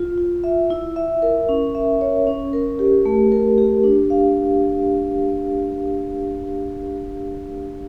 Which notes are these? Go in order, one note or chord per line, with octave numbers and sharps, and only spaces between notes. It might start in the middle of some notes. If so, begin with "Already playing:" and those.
Already playing: F4
F4
E5
E4
E5
A#4
C#4
E5
C#5
C#4
A#4
G4
A3
A#4
G4
D4
F5